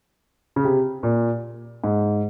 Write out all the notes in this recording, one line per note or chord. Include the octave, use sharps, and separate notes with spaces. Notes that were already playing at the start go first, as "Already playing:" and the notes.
C#3
C3
A#2
G#2